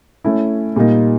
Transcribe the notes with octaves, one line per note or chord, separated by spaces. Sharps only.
A3 C#4 E4
A#2 G3 A#3 D#4